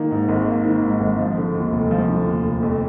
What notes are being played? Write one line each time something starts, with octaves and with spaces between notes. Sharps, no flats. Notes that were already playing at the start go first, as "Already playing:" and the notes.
Already playing: D#3 A#3
G#2
G#1
A#3
D#3
G#2
G#1
F3
D3
D#2
F1
F3
D3
D#2
F1
F2